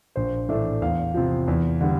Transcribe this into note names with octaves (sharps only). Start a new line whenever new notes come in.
A#1 C5
A2 E3 A3 D4 E5
E2 F5
C3 F3
E2
D3 G3 D4